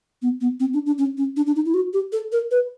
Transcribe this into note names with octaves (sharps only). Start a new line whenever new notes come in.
B3
B3
C4
D4
D4
C#4
C#4
D4
D4
D#4
E4
F#4
G4
A4
A#4
B4